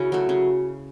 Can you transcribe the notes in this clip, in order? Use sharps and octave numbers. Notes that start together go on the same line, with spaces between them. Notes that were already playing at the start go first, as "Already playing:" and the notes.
Already playing: C#3 C#4 E4 F#4
F#3 A3
C#3